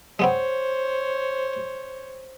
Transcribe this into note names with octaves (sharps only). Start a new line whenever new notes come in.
G#3 B3 C4 C5 C#5